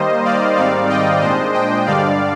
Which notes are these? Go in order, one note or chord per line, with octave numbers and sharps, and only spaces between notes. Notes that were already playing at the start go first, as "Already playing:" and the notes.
Already playing: D#3 G3 A#3 C5 D#5
D5 F5
G#2 D#3 G3 C4 D#4 D5 F5
D#5 G5
A#2 G#3 D4 C5 D#5
D#5 G5
G2 D3 G3 D4 D5 F5